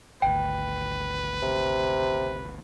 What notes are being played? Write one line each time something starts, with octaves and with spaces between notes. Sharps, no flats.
G#1 D2 B4 G5
C3